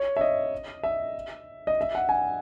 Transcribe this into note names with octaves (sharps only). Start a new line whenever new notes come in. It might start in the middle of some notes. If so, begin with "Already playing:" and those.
Already playing: C#5
E5
D#5
E5
D#5
E5
F#5
G#5